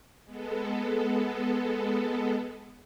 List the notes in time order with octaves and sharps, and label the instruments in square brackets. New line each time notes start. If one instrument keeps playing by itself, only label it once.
[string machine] G#3 B3 A4